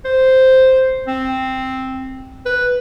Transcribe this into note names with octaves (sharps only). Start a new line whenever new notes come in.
C5
C4
B4